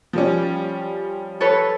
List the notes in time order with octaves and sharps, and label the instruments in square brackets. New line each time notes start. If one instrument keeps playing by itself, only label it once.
[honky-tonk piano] F3 G3 C#4
[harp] A4 B4 C#5